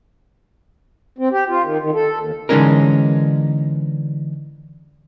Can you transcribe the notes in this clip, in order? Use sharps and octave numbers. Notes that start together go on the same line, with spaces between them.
C4
G4
F4
D#3
D#3
A4
D#2
D3 E3 G#3 C#4 D#4 A#4